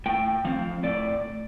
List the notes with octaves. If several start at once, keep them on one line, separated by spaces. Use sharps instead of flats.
A2 G5
F3 C4 F5
A2 D5